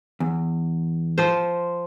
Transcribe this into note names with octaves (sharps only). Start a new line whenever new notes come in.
E2
F3 C5